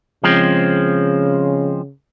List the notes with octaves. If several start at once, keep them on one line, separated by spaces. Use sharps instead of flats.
C#3 F3 G#3 C4